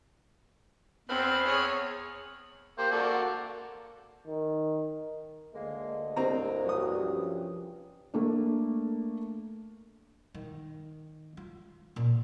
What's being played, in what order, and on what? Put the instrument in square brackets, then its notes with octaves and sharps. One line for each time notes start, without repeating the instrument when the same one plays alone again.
[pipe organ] E2 B5 F6 [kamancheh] C4
[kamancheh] G#4 C#5
[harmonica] A#3 G4 [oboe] C5
[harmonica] A#3 F#4 A4 [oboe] D5
[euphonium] D#3
[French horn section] D2 A4 D#5 [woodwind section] G#3 A#3
[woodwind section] C2 G2 [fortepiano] C4 A#5
[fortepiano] F#3 D#6
[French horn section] F3 C#4 G4
[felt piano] A3 A#3 D4
[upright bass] D#3
F4
A#2